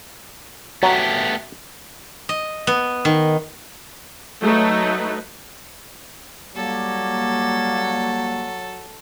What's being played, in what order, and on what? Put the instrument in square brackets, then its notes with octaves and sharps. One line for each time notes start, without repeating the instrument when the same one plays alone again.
[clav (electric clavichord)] F#3 [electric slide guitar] A3 B3 G4
[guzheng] D#5
B3
D#3
[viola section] F#3 A3 D#4 B4
[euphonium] F#3 [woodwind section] G3 A#3 [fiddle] A4